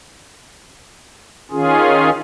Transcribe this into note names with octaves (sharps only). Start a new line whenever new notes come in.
D#3 C#4 F4 G#4